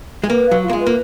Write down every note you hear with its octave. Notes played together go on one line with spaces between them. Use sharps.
G#3
A#3 B4
F5
F#3
F4
A#3
G#3
B4
A#3